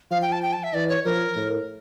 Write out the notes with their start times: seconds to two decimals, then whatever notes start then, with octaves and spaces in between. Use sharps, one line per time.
0.11 F3 F5
0.22 G5
0.32 A5
0.42 G5
0.53 A5
0.63 E5
0.74 E3 D5
0.89 C#5
1.05 F3 A#4
1.36 A2